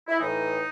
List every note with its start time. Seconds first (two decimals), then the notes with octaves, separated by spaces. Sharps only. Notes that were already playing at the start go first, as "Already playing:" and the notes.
0.08 E4
0.19 A2 E3 D#4